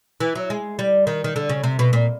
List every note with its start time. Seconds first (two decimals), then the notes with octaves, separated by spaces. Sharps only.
0.20 E3
0.35 F#3
0.50 G#3
0.79 G3
1.07 D#3
1.24 D#3
1.36 D3
1.49 C#3
1.63 C3
1.79 B2
1.93 A#2